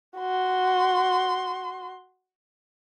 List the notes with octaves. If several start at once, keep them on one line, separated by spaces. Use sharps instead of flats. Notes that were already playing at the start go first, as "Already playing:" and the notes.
F#4 C6